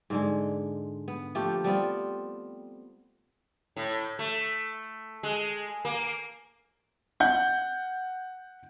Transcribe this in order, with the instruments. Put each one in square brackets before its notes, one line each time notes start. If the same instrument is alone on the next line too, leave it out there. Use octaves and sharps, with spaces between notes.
[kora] G#2 D3 G#3
B3
F3 A3 A#3 G4
G3 B3 C4 F4
[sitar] A2
A3
G#3
A#3
[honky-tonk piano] F#5 G6